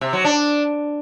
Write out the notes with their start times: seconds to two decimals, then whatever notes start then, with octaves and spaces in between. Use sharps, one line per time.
0.01 C3
0.13 F#3
0.25 D4